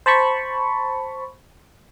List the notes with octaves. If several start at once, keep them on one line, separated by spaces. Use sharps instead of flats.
C5 A5 B5 C#6